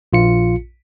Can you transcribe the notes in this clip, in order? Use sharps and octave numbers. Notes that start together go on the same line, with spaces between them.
A#1 F4 C#7